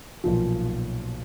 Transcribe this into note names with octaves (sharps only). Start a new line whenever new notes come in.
B1 A#2 F3